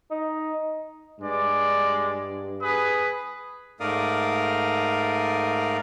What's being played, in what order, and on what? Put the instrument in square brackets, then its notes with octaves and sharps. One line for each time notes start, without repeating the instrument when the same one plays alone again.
[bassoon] D#4
[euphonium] G2 [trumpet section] G#3 D5
[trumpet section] G#4 B4 [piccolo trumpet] D#6
[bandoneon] G#2 A3 A#4 D5 F5 D#6